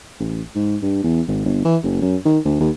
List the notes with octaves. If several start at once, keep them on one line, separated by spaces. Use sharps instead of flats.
A1
G#2
G2
E2
G#1
G1
E3
F#1
F#2
D#3
D2
D#2